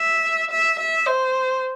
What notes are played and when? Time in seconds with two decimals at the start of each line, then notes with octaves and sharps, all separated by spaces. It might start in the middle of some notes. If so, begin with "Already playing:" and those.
Already playing: E5
0.50 E5
0.79 E5
1.06 C5